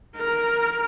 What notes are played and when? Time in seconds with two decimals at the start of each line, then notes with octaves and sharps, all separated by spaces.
0.16 A#4